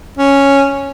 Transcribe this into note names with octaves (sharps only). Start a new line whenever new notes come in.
C#4